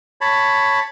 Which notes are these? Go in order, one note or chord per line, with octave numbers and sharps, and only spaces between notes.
C#5 A5 B5